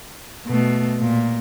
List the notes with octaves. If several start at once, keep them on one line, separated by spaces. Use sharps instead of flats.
B2 A3
A#2